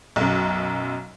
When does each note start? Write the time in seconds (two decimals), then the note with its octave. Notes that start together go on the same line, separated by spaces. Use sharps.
0.16 B1 F#2